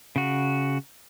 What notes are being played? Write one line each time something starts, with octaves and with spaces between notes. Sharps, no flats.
C#3 F#4